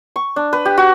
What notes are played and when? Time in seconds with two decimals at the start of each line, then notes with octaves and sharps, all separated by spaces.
0.16 C#6
0.36 D4
0.53 B4
0.65 G4
0.78 F#4